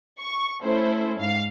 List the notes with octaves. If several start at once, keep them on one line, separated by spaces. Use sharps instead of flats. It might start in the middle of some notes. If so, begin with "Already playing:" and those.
C#6
A3 C#4 E4 A4 C5
G#2 F5